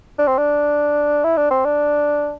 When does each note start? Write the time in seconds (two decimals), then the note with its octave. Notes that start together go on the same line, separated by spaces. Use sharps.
0.19 D4
0.28 C4
0.38 D4
1.24 E4
1.37 D4
1.51 C4
1.65 D4